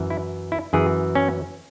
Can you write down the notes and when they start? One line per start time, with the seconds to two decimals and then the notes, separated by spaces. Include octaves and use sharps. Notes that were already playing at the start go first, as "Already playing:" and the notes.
Already playing: F#2 E3
0.10 E4
0.52 E4
0.73 F#2 E3 G#4
1.15 C#4